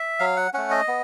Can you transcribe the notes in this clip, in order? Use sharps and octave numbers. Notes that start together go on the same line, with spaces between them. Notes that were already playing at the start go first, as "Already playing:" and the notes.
Already playing: E5
F#3 F5
F#5
A3 C#4 F#5
D#5
B3